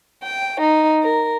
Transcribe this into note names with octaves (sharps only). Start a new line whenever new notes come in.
G5
D#4
A#4